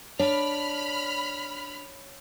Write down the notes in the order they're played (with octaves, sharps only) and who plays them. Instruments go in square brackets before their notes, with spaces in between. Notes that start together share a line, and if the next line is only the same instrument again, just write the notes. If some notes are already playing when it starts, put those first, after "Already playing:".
[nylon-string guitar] D4 [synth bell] C#5 [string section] B5 F6